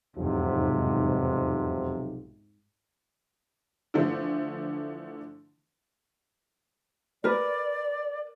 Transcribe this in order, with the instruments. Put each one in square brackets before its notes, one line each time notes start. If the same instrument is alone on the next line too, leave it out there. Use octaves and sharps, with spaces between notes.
[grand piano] F1 E2 [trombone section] B1 C3 F3 [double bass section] G#2
[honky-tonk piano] D3 E3 F3 A3 D4
[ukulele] A#4 B4 [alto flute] D5